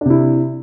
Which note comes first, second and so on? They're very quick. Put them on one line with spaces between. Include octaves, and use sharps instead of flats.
D4 C3 E4